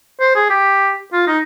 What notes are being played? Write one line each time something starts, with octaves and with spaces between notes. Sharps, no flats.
C5
G#4
G4
F4
D#4